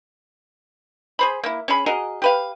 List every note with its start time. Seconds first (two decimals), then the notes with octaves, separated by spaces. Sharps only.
1.19 G#4 C5 B5
1.43 A#3 E4
1.68 C#4 G#4 B5
1.86 F#4 G#4 A#4 D#5
2.22 G4 B4 F5